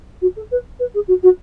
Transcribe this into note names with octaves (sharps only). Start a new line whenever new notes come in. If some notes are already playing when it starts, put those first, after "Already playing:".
F#4
A4
B4
B4
G#4
F#4
F#4